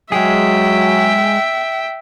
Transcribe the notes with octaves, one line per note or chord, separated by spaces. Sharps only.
F#3 G#3 G#4 E5 G5